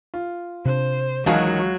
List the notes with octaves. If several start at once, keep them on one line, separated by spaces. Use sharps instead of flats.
F4
C3 D4 C5
C#2 D#3 E3 F#3 C#4 F#4 F5 G#5